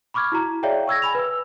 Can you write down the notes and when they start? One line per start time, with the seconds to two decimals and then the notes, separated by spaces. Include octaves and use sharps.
0.14 B5 C#6 D6 F6 G#6
0.32 E4 F#4 A#5
0.63 G#4 C#5 D5 E5 F5 G5
0.87 C#6 E6 G#6 A#6
1.02 G#5 B5 F7
1.15 B4 E6